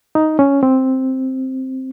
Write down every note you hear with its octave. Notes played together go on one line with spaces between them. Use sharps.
D#4
C#4
C4